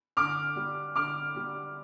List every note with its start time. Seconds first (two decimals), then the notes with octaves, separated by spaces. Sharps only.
0.17 D3 D6 F6
0.56 G3
0.96 D3 D6 F6
1.36 G3